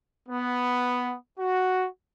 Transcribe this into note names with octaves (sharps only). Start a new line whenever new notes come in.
B3
F#4